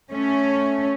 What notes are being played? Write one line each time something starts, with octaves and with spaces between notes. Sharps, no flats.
A3 C#4